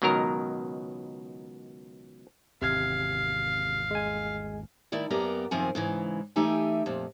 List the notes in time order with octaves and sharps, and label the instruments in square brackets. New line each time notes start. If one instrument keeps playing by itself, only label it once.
[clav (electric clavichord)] C#2 B2 D#3 F#3 A#4 A#5
[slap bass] G#1 E2 [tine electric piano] C3 F6 G#6 [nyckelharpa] F5
[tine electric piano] G#3 G#5
[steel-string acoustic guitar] D#3 A3 E4 D5
F#2 A#3 B3 G4 D5 A#5
F#2 C3 D#3 F3 C4 G#5
G#2 C#3 E3
E3 A3 D#4 G4 E5 G#5
F2 A#2